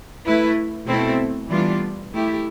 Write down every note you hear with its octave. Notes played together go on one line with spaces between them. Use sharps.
A3 E4 B4
B2 A3 C4 E4 A4
E3 G3 B3 D4 F4
A3 E4 G4